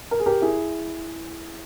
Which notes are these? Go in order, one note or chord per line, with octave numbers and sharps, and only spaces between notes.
A#4
G#4
G4 A#4
E4 G#4